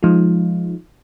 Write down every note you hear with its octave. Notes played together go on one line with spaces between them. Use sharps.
F3 G#3 D#4 F4